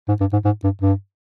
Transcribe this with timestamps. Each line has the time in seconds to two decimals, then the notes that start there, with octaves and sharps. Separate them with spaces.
0.08 G#2
0.21 G2
0.33 G#2
0.45 G#2
0.64 G2
0.82 G2